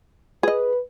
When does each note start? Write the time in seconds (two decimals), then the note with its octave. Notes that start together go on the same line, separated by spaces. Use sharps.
0.43 G#4 B4 D#5